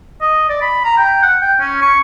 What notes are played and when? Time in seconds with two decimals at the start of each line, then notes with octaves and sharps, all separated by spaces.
0.21 D#5
0.49 D5
0.62 B5
0.85 A#5
0.98 G5
1.23 F#5
1.41 G5
1.60 C#4
1.82 C#6